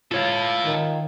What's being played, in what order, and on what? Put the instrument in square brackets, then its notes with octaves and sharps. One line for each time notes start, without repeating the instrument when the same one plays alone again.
[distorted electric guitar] E4 A4 [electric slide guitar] F4 C#5 F5
[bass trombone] D#3